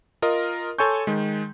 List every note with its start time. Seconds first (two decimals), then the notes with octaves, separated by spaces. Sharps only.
0.22 F4 A#4 D#5
0.79 A4 C#5 G#5 C6 C#6 G6
1.07 D#3 G#3